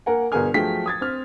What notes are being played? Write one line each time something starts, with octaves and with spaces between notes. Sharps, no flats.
A#3 A#4 F#5 G#5
G1 B2 G#4 A#4 G#5 F6
F3 F#3 A3 G#4 G5 B6
D#6 G#6 A6
C4 F6